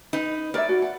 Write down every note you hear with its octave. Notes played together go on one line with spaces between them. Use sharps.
D#4 B4
A#4 C#5 D5 E5
F#4
F#5